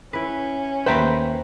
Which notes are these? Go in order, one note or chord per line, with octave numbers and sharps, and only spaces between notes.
C#4 E4 B4
D#2 B4 C5 E5 G5 A#5 B5